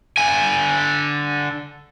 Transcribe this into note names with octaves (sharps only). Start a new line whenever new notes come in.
D3 G#5